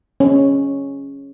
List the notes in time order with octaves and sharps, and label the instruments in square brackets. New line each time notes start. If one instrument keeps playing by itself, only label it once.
[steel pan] C#4